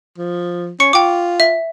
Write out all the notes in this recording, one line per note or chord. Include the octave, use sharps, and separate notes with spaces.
F3
C#4 C#6 C#7
F4 G5 D6
E5